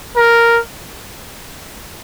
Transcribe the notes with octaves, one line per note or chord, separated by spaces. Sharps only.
A#4